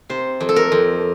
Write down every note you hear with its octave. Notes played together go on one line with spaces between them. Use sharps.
C3 C5
F2
A4
A#4
F2